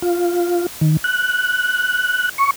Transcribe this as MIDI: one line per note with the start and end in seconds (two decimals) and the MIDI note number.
0.02 0.67 65
0.81 0.97 51
1.04 2.29 90
2.38 2.51 85